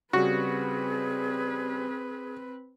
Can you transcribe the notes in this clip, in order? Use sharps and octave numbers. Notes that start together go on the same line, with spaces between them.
C#3 G3 C4 F#4 G#4 B4